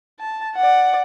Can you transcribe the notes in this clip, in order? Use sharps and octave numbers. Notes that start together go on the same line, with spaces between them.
A5
D5 F#5